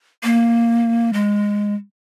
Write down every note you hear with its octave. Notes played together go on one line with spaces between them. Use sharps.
A#3
G#3